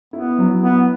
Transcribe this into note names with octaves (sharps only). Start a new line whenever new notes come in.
B3 E4
F#3
B3 E4